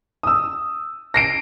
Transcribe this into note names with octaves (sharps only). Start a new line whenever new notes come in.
D#6 E6
A#6 C7 D7